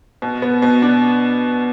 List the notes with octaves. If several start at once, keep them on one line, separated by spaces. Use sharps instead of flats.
B2
B3
B2
D4